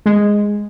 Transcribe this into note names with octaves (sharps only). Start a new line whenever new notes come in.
G#3